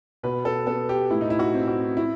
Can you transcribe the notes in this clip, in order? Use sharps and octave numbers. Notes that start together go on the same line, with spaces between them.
B2 B4
A4
B3 A4
G4
A2 E4
D#4
E4
F#4
C4
F#4
E4